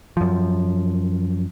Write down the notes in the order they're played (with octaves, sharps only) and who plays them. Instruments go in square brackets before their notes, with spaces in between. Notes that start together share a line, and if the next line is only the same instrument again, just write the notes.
[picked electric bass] F#2 F3